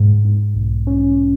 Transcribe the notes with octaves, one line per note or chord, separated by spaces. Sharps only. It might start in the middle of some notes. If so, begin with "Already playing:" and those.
Already playing: G#2
G#2
B1
C#4